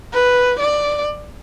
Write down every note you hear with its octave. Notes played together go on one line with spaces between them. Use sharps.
B4
D5